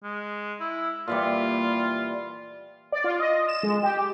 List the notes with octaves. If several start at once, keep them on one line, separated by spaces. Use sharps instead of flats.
G#3
E4
A#2 E3 G3 F4
D5
F4
D#5
E7
G#3
G4